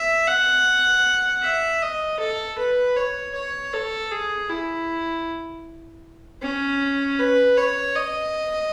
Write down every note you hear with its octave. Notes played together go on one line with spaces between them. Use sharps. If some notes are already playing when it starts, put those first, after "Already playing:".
Already playing: E5
F#5
E5
D#5
A4
B4
C#5
C#5
A4
G#4
E4
C#4
B4
C#5
D#5